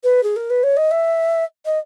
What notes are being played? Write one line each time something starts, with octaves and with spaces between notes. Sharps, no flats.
B4
G#4
A#4
B4
C#5
D#5
E5
D#5